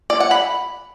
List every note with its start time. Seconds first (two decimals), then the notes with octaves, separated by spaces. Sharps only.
0.10 D5
0.20 F#5
0.31 B5